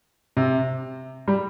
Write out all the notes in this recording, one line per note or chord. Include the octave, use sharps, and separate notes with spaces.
C3
G3